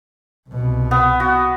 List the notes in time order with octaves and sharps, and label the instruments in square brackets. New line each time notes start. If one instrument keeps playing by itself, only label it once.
[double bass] C2 B2
[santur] B3
F#4